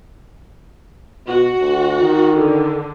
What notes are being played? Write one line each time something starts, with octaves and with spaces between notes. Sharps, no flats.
B2 F#4
D2
D#3
D3